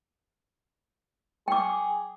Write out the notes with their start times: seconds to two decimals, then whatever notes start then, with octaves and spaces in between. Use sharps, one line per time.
1.48 G#4 G5 D6